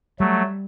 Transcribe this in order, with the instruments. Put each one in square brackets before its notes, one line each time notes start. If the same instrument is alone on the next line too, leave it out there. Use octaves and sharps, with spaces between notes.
[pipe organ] F#3 A3 [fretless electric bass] G3